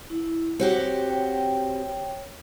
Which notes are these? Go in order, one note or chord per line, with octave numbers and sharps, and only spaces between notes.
E4
C4 F#4 G4 C#5
C#5 G5